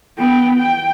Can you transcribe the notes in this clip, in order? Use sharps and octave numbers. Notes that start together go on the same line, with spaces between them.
B3 G5
G5